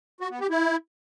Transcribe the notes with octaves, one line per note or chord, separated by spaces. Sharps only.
F#4
B3
G4
E4